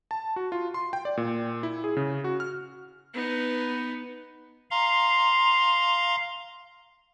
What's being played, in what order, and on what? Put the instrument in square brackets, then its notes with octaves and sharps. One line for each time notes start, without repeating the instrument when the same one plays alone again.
[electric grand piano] A5
F#4
F4
C6
G5
D5
A#2
E4
G#4
C#3
F#4
F6
[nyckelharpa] B3 D#4
[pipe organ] F5 A#5 C6